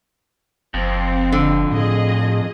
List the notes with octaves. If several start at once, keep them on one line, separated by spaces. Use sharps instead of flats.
F#1 F2 C4
D3
A2 G#4 D#5